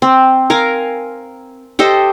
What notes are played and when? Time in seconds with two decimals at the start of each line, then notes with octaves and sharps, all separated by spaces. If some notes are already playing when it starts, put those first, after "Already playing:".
0.02 C4
0.50 A#4 F5 G#5 A#5
1.79 G4 A4 C5 D#5